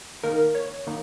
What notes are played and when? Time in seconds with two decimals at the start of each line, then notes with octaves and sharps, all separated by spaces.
0.23 D#3 A#3 D#4 A#4
0.55 C#5
0.87 D#3 A#3 D#4